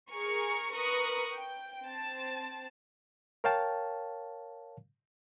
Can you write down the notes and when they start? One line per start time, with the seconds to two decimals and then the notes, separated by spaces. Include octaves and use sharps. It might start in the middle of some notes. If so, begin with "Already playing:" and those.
0.13 G#4 A#4 C#6
0.73 A#4 B4 A#5 C#6 D#6 F#6
1.34 G5
1.85 C4 A5
3.44 A#4 C#5 F5 G5 A5